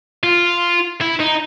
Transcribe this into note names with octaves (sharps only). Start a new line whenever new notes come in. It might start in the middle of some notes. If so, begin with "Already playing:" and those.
F4
E4
D#4